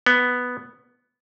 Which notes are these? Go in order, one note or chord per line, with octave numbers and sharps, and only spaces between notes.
B3